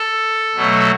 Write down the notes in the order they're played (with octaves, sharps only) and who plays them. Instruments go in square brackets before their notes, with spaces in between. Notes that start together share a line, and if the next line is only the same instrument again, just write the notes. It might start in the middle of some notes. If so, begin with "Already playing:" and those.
Already playing: [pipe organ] A4
B2 F#3 A3